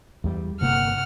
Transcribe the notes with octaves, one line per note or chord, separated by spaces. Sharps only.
E2 G3
G1 C3 A#3 F#5 F6